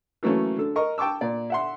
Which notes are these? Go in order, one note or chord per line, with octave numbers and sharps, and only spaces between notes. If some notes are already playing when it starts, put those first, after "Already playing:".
E3 F#3 A3 A#3 C#4
D3 A4
A#4 D#5 C#6
G5 A5 C#6 D6 E6
A#2 D5
E5 F#5 C6